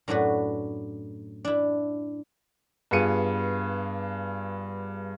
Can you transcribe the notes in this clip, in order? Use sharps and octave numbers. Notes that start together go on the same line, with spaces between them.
F#2 A2 D4 F#4 B4
D4 E4
G2 B3 F4 G#4 C#7 D#7